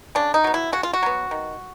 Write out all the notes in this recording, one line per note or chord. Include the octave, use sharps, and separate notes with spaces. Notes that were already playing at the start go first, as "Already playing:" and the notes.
C#3 D4
D#4
F#3 B3
E4
C#3 F#4
F4
F#4
F#3 B3
D#3